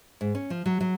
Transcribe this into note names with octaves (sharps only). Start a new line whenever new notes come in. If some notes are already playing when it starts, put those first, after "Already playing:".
G#2
C#4
F3
F#3
F#3